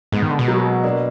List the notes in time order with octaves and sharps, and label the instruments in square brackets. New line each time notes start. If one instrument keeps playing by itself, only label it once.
[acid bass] G#2 [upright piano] G#3 B3
[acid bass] D#3
D3
B2
[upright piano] F#3 A#3
A#3 D4